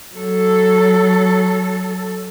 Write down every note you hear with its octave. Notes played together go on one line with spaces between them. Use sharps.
F#3 A4